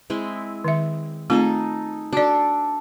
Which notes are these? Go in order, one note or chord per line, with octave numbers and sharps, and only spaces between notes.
G#3 C4 E4
D#3 E5
A3 C4 D#4 F4 G#4 A4
D4 F#4 A4 D5